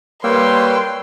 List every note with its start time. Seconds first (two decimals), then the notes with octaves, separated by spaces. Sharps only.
0.24 G3 A#3 B4 C#5 G5 C6 E6